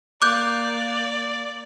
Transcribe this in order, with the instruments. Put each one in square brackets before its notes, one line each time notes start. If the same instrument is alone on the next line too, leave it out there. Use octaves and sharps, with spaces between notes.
[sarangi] A#3 [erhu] D5 [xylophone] D6 F#6 G6